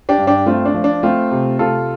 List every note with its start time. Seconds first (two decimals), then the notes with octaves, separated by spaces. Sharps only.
0.09 D4 G4
0.18 G2
0.27 D4 G4
0.46 A3 C4 F4
0.65 D4
0.74 F3
0.84 D4
1.03 A3 C4 F4
1.31 C3
1.59 C3 F4 A4